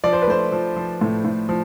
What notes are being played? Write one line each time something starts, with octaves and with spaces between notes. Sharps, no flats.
F3 D5
C5
B4
A3 C5
F3
F3
A2
A2
F3